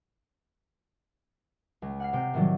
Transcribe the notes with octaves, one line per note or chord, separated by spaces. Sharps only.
C#2
F#5 F6 C7
C3 G5
A2 D#3 E3 F#3 G3